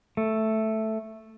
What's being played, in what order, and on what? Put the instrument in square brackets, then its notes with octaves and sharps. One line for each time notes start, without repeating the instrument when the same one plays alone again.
[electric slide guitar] A3